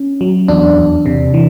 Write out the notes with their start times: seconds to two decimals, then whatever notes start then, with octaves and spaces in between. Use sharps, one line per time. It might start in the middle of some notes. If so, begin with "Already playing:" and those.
Already playing: C#4
0.21 F#3
0.48 E2 D4
0.77 E2
1.06 C3
1.34 E3